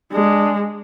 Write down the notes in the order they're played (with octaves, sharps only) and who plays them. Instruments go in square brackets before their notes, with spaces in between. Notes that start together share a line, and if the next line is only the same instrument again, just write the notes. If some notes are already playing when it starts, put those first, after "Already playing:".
[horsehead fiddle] G#3 [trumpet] D4